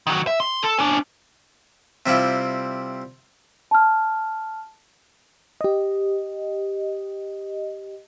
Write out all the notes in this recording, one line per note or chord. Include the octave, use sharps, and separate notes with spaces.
D#3 F#3
E5
C6
A4
C#4 D4
C3 G3 E4 F4
A5 F6
G4 D#5